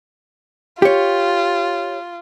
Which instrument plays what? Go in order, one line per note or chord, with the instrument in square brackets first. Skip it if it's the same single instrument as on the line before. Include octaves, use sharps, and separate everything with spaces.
[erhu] F4 [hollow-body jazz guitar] G4 C#5